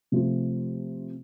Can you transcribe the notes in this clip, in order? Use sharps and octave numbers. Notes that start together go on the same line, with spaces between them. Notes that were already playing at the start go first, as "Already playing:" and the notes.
C3 F3 A3 C4 F4